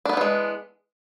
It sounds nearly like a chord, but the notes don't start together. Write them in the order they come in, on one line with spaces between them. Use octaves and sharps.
D4 B3 G3 E3 G#3